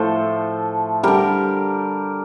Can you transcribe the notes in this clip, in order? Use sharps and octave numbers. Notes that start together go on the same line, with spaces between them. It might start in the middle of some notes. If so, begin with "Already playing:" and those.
Already playing: A2 F3 A3 A4 C5
D3 G3 G4 A#4